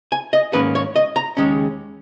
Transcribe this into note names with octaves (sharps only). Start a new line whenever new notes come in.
G#5
D#5
G#2 D#3 A#3 C#4 B4
C#5
D#5
A#5
D#2 C#3 G#3 C#4